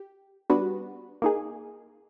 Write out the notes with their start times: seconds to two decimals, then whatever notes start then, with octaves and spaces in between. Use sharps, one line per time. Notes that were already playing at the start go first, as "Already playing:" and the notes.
Already playing: G4
0.50 G3 B3 D4 F#4 B4
1.22 A#3 D#4 G#4